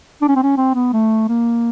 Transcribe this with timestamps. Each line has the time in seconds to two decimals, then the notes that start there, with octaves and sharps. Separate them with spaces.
0.22 D4
0.29 C#4
0.36 C4
0.43 C#4
0.57 C4
0.75 B3
0.93 A3
1.29 A#3